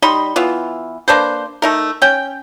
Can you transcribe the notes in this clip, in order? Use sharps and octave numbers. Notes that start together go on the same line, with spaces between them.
G3 D#4 B5 C6
E3 B3 F4
A#3 D4 B4 C5
A3 D#4 A#4
C#4 G5